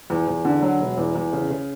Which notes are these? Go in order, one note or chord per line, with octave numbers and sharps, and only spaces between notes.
E2
E2
D3
F#3
E1
E2
E2
C#3
C#3